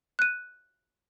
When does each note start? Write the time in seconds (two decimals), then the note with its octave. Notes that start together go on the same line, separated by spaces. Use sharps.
0.19 F#6 D#7